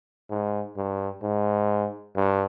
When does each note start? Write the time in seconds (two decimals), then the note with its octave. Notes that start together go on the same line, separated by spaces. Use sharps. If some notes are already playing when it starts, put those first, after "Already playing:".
0.30 G#2
0.77 G2
1.23 G#2
2.16 G2